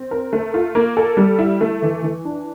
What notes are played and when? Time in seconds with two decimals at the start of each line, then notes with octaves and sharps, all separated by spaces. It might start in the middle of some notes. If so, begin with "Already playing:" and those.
Already playing: C4
0.11 A#4
0.33 A3
0.54 F4
0.75 A#3
0.97 A4
1.17 G3
1.39 E4
1.61 A3
1.82 E3
2.02 E3
2.25 D4